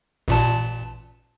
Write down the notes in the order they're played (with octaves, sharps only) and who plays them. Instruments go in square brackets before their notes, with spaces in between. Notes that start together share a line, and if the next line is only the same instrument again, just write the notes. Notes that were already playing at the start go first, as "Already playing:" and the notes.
[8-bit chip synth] A1 A#2 A5